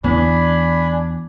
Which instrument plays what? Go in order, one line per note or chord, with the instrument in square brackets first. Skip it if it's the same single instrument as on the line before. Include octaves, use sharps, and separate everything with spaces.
[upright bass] E2 [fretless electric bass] E3 B3 [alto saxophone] D4 [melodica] G#5 B5